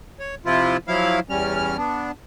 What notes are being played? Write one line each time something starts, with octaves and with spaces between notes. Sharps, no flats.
C#5
C3 F3 E4 F4
F3 F#3 E4 F5
E2 G3 C#4 F6
B3 D4